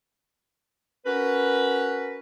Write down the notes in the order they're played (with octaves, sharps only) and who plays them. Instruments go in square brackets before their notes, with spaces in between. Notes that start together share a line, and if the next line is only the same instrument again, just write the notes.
[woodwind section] C#4 F#4 A#4 B4